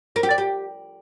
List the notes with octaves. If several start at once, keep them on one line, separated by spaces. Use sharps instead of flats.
A#4
G4
D5
G4